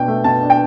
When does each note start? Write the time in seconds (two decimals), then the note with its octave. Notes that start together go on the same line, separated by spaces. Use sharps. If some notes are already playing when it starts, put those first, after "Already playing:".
Already playing: B2 D4 G5
0.08 A3
0.24 B2 A5
0.41 D4
0.50 G5